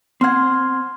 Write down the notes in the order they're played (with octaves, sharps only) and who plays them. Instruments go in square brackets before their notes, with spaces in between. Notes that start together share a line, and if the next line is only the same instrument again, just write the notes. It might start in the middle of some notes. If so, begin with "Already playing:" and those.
[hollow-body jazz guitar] C4 F#5 [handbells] C6 F6 G#6